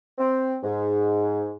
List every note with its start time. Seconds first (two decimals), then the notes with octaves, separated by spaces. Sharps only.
0.18 C4
0.63 G#2